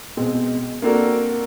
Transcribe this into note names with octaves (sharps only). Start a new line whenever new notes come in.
B2 G#3 C4
A#3 C4 D4 F#4 A4 A#4